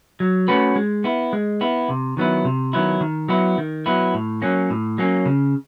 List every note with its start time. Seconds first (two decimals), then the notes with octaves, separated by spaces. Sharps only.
0.20 F#3
0.48 A3 C#4 F#4 B4
0.76 G#3
1.04 B3 E4
1.33 G#3
1.61 B3 E4
1.89 C3
2.17 D#3 F#3 B3 E4
2.45 C3
2.73 D#3 F#3 B3 E4
3.01 D#3
3.29 F#3 B3 E4
3.58 D#3
3.86 F#3 B3 E4
4.14 A2
4.42 F#3 A#3 C#4
4.70 A2
4.98 F#3 A#3 C#4
5.26 C#3